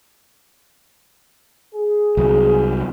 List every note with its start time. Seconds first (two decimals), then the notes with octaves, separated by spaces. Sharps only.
1.74 G#4
2.17 C2 F#3